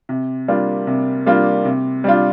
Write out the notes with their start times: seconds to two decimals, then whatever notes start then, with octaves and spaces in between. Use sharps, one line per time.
0.09 C3
0.48 G3 A#3 D4 F4
0.87 C3
1.26 G3 A#3 D4 F4
1.65 C3
2.04 G3 D4 F4